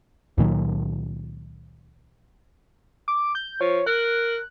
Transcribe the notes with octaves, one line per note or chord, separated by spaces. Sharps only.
C#2 A#2 D#3 F#3
D6
G6
F3 C#5
A#4 F#6